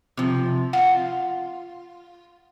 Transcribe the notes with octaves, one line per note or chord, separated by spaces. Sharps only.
C3 F3
F4 F#5